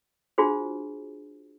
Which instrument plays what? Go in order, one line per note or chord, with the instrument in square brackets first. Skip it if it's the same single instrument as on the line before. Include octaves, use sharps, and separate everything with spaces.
[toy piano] D4 F4 F#4 G#4 C5